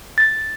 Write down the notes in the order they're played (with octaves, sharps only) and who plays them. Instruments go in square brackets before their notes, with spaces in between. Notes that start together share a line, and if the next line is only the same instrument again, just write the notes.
[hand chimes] A6